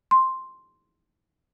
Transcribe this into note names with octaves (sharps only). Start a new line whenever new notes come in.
C6